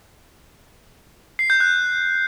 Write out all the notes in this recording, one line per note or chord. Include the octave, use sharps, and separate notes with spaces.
C7
G6
F#6